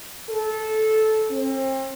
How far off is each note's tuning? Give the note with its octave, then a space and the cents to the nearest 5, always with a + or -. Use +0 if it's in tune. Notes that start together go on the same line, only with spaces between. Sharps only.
A4 -15
C4 +35